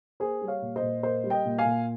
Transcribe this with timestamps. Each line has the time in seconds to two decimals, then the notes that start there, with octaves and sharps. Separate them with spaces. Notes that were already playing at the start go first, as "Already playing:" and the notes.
0.20 A#3 G#4 C5
0.41 G3
0.47 C#5 F5
0.62 A#2
0.76 C5 D#5
0.82 A#2
1.03 A#3 C5 D#5
1.24 G3
1.30 D#5 G5
1.45 A#2
1.58 F5 G#5
1.65 A#2